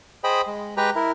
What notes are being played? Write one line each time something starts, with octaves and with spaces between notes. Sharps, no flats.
G#4 C5 D#5 G5 B5
G#3
G#3 G4 B4 G5 A#5
E4 A#4